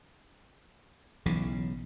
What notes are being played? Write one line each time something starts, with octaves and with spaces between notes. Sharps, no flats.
B1 C#3 E3